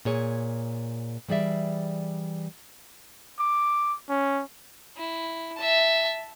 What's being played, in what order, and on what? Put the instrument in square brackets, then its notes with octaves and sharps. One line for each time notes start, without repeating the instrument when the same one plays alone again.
[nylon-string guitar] A#2 G#4 C#5
E3 G3 G#4 D5 E5
[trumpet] D6
C#4
[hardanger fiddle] E4
E5 A5